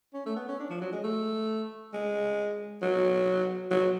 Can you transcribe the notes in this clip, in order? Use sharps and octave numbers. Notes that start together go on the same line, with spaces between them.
C#4
A3
B3
C#4
D4
F3
F#3
G#3
A3
G#3
F#3
F#3